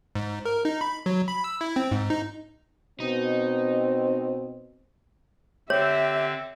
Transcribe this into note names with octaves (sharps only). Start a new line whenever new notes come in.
G#2
A#4
D#4
B5
F#3
B5
E6
E4
C4
G#2
D#4
B2 C4 D#4
D3 C4 G4 C#5 E5